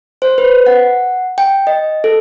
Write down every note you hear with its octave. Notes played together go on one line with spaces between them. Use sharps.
C5
B4
F#5
G5
D#5
A4